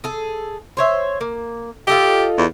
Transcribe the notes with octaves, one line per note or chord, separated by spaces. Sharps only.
G#4 A4
C5 C#5 E5
A#3
F4 G4 A4 D#5
E2